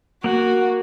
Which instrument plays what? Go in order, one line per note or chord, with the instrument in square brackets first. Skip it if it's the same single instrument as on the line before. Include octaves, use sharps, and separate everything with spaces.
[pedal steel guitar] A#3 F#5 [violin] F#4